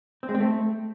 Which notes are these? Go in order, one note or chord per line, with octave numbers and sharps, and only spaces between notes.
C4
G#3
C4
A3